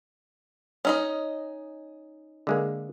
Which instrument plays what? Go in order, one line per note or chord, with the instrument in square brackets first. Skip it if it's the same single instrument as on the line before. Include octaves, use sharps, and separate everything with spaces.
[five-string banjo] C#4 D#4 D#5
[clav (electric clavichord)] D3 G#3 A#3